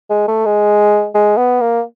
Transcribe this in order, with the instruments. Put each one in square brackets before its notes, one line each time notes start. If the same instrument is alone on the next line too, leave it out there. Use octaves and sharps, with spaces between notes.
[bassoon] G#3
A3
G#3
G#3
B3
A#3